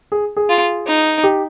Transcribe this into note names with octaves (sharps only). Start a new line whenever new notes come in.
G#4
G#4
F4
D#4
G4